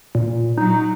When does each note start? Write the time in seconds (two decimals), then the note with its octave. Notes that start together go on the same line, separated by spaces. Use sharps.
0.15 A#2
0.57 F#3 D#4